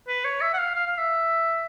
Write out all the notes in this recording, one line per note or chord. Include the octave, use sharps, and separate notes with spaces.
B4
C#5
E5
F#5
F5
F5
F5
E5